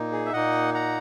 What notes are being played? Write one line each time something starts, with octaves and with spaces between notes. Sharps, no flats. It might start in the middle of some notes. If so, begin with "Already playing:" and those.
Already playing: A#2 A#3 D#4
G#4
E5
A#2 A#3 D#4 D#5 F#5
F#5 A#5